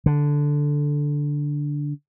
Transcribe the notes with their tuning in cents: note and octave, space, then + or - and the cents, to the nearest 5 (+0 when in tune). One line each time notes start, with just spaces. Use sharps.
D3 -5